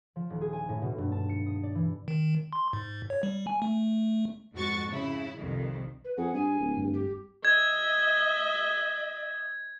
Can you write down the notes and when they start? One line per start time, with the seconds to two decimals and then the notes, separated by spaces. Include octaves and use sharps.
0.16 F3
0.30 D#1
0.41 G#4
0.53 G#5
0.69 A2
0.82 B2
0.98 G2
1.12 A5
1.29 C#7
1.46 D#6
1.63 D5
1.75 E3
2.08 D#3
2.53 C6
2.73 G#2
3.10 C#5
3.23 G3
3.47 G#5
3.62 A3
4.54 F2 G#2 F#4 C#6 A6
4.90 C#3 E4
5.38 C2 F2 D#3
6.05 B4
6.17 F2 G#4 F#5
6.34 G2 G#5
6.60 D1
6.76 G2
6.94 G4
7.45 D#5 E5 G#6